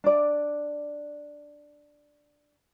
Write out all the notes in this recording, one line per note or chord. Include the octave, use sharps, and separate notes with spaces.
D4 D5